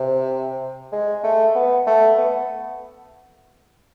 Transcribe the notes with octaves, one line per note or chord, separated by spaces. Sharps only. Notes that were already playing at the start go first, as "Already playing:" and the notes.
Already playing: C3
G#3
A3
B3
A3
B3